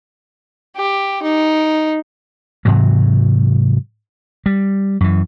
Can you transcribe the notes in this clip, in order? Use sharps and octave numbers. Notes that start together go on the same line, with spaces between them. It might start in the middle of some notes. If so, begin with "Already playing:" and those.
G4
D#4
G#2 C3 E3 F#3
G3
F#2 E3